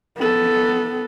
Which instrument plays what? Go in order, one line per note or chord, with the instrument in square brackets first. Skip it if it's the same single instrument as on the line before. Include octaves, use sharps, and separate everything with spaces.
[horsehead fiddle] B3 A4